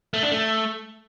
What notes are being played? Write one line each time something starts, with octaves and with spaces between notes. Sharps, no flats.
A3
D4
A3